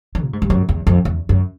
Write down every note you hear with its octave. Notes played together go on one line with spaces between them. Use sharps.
E3
A#2
G#2
G2
F#2
E2
F2
E2
F#2